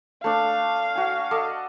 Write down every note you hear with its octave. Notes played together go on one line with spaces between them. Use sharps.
A3 D4 F5
F#4 G#5
A4 D5 D#5